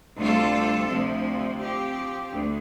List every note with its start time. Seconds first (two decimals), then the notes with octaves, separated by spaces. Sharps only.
0.17 D2 C3 G3 F4 A4
0.88 D2 C3 F3 C4
1.59 F3 C4 G4
2.30 D2